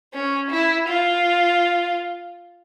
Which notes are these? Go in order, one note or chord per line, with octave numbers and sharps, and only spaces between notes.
C#4
E4
F4